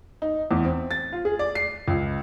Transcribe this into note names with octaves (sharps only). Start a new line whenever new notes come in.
D#4
E2
C4
A6
F4
G#4
D5
C7
C#2